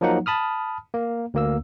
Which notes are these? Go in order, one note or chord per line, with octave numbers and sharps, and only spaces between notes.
F3 F#3 A#3 D#4 F#5
A5 B5 D#6 F6
A#3
D2 A#3 E6